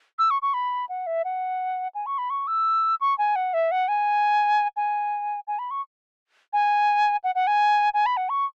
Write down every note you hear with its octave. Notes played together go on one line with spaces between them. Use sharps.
E6
C#6
C#6
B5
F#5
E5
F#5
G#5
C#6
B5
C#6
E6
C#6
G#5
F#5
E5
F#5
G#5
G#5
G#5
B5
C#6
G#5
F#5
F#5
G#5
G#5
B5
F#5
C#6